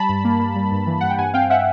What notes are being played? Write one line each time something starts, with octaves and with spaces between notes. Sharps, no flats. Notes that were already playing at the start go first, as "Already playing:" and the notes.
Already playing: G3 A5 B5
G2
A#3
A#3
G3
G2
E3
G2 F#5
G5
G2 F#5 G#5
C4 F5 G5
C4 E5 F#5